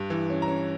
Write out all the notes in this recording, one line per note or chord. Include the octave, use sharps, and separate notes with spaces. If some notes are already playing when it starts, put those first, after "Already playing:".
Already playing: G2
E3
C#4
A#5
C#4